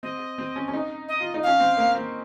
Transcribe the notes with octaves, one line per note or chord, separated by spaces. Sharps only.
C4 D#5
C4
C#4
C#4
D#4
D#5
F4
D#4
C#4 F5
C4
A#3
C4